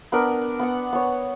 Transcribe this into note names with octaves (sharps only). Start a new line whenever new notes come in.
B3 D4 A#4 B4
B3 F#5
B3 C#5